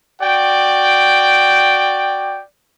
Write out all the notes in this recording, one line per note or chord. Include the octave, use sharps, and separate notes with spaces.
F#4 D5 G5